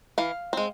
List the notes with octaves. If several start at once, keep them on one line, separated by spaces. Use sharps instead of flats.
E3 F5
G#3 C4